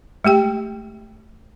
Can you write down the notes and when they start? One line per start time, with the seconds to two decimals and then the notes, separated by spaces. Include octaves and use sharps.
0.24 G#3 A3 G4 G5